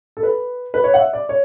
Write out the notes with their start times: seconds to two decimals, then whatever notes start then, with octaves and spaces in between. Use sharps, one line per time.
0.17 A4
0.23 B4
0.74 B4
0.84 C#5
0.94 F#5
0.99 E5
1.13 D5
1.29 C#5